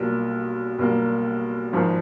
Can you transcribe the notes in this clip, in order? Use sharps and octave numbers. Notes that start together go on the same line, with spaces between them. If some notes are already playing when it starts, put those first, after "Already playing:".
Already playing: B1 A#2 G3 A#3
B1 A#2 G3 A#3
G#1 G#2 F3